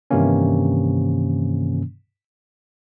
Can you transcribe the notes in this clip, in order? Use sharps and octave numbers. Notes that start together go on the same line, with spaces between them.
G2 C3 D#3 E3 A#3 C#4